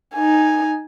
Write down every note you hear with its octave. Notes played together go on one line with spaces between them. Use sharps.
D#4 G#5